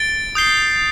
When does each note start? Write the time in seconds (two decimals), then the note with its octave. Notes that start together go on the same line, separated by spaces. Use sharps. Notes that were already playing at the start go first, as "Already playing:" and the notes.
Already playing: A6 D7 G7
0.35 D#6 G6 C7 G7